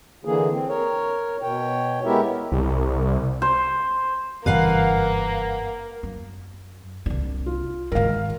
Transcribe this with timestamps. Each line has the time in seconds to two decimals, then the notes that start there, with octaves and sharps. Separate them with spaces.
0.25 D3 E3 A#3 G#4
0.51 C4
0.68 A#4 C#5
1.42 B2 C#5 G5
2.05 G#3 B3 E4 G4 A#4 E5
2.52 C2
3.42 C5
4.46 F#1 G2 E3 A#3 B4 F5 F#5
6.03 F#2
7.06 C2 D4
7.46 F4
7.92 G#2 D#3 A#4 F5